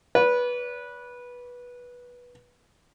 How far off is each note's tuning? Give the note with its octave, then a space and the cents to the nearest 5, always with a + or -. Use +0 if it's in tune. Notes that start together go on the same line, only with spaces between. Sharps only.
B4 -15 D5 -45